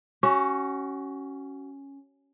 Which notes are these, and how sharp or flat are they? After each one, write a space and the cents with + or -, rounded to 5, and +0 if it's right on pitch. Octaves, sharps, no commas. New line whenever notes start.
C#4 +0 F#4 +30